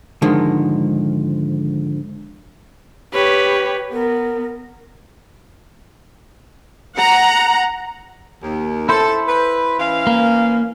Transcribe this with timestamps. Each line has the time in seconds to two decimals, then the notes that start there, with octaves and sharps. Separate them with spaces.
0.22 G#2 D3 D#3 F3 G#3
3.14 G4 B4 C#5
3.93 B3 A#4
6.97 F#5 A#5
8.42 D#2
8.89 E4 A4 C5
9.28 B4
9.79 E3 C#4 F5
10.07 A#3